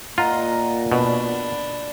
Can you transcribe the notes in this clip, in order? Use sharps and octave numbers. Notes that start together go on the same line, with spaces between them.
A#2 F4 D#5 F#5 A#5
B2 D4 B5